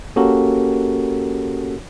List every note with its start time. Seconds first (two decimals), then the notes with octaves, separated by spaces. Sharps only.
0.16 A#3 C#4 F#4 G4 A4 A#4